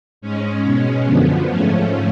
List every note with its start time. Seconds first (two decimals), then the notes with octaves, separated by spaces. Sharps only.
0.21 G#2 G#3 C#4
0.64 B2 G#3
1.06 F#2 D3 F3 B3
1.48 G#2 F3 A3 C#4